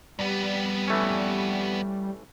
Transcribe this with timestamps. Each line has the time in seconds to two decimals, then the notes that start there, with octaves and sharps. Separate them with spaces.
0.19 F2 G3 B3
0.88 E3 A3 C#4